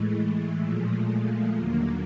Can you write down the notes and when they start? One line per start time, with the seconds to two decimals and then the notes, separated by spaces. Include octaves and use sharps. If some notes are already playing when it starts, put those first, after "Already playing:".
Already playing: A2 E3 G#3 A3
0.64 A#2 F3 G#3
1.56 D#2 D3 F#3 A#3